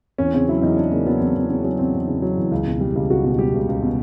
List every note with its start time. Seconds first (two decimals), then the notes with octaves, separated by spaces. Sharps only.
0.18 E2 C#4
0.33 C#3 C4
0.49 F#3 E4
0.62 E2 D#4
0.77 E2 D4
0.91 C#3 A#3
1.06 F#3 B3
1.20 E2 C4
1.35 E2 C4
1.49 C#3 B3
1.64 F#3 C#4
1.79 E2 C4
1.93 E2
2.08 C#3
2.22 F#3
2.37 E2
2.51 C#2
2.66 B2
2.81 G3
2.95 C#2
3.10 C#2 F#4
3.24 B2
3.39 G3 G4
3.54 C#2
3.69 C#2
3.82 B2